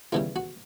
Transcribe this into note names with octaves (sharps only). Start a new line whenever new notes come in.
E2 C#3 E3 G3 F4
F#4